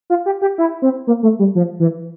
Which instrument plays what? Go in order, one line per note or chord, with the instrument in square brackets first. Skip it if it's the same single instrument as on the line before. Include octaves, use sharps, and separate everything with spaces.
[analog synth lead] F4
G4
G4
E4
C4
A#3
A3
G3
F3
E3